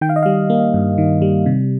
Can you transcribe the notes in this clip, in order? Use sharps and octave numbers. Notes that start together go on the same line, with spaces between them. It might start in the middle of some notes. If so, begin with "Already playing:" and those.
D#3 G5
F5
D#5
G3 F5
A#3
G2
D#3
G3
C3